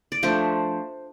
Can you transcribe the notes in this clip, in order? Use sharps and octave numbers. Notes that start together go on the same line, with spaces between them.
D5
F3 A3 D4 C5